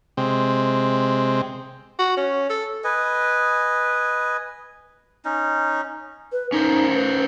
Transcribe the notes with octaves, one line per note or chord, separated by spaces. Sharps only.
C3 G#3 C4
F#4
C#4
A4
B4 D#5 G#5
C#4 D#4
B4
C#4 D#4 A#4 C5
B4